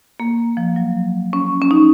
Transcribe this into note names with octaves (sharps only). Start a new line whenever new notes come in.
A#3
F3
F#3
C#4
C#4
D#4